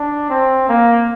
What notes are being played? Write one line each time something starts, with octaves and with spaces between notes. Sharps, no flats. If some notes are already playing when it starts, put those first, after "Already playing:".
Already playing: D4
C4
A#3